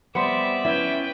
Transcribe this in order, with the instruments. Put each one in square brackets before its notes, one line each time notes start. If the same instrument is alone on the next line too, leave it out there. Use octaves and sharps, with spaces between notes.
[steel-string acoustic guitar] G3 C4 B4 [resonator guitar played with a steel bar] B3 C5 [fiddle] D5 E5
[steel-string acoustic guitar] C#4 [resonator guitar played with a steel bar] E4 [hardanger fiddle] B4 G5